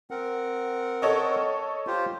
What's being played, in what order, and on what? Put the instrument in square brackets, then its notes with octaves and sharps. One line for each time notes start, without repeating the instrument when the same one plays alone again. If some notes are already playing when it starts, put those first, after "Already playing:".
[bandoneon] C4 A#4 F#5
[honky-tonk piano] A4 C#5 D#5
[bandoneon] F4 G4 C5